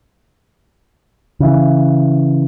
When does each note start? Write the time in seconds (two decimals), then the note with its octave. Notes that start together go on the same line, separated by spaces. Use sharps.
1.40 C#3 E3